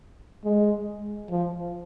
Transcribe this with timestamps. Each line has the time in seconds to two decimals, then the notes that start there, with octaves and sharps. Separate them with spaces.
0.45 G#3
1.30 F3